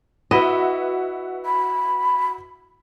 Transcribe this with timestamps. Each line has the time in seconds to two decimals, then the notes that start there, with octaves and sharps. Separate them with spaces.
0.31 E4 F#4 B4 D#5 E5
1.46 B5